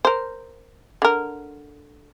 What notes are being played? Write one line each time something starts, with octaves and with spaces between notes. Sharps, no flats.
A#4 C5
D3 A#4